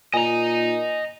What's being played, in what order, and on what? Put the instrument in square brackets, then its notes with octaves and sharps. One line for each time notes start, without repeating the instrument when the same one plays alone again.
[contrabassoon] A#2 [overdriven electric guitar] D#5 A#5 [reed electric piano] G#5